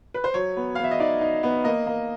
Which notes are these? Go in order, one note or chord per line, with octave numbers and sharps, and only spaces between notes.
B4
C5
F#3 C#5
B3
F5
B3
E5
D#5
D#4 D5
D#4
B3
A#3 D#5
A#3